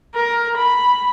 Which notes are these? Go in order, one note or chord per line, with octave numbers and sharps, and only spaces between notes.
A#4
B5